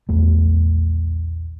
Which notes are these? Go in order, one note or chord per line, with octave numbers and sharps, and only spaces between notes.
A#1 E2 A3